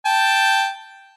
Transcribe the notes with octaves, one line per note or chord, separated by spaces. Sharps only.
G5 A5